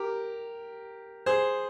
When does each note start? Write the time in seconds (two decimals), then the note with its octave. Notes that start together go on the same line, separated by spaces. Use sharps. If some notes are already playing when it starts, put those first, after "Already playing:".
Already playing: G4 A#4
1.26 G#4 C5